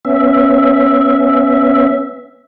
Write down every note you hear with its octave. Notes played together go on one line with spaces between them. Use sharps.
B3 C#4 E5